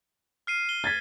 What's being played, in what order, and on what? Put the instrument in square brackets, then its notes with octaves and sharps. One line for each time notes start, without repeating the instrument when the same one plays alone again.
[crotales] F6 C7 D#7
G7
[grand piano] G#6 A6 B6